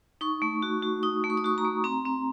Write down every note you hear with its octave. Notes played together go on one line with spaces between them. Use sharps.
D#4 C#6
A3
F#4
F#4
D#4 D#6
A3
C#6
D#6
F#4 C#6
A#5
A3
C4 A#5
C4